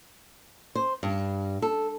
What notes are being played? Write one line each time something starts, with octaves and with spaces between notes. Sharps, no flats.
C5
G2
A4